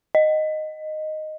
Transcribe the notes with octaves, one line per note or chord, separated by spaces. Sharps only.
D#5